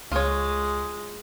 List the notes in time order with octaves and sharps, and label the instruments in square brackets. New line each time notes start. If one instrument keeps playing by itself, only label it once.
[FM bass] C#2 [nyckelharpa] G#3 [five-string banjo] F4 C#5